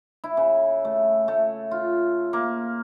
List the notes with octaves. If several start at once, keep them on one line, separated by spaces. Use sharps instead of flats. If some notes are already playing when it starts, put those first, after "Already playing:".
E4
C#3
A3
A3
F4
A#3